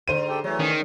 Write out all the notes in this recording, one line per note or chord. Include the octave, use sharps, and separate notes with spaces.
G#2 D3 C5 D#7
G4 A4 G5
E3 F#3 A3 C#5
D#3 C#4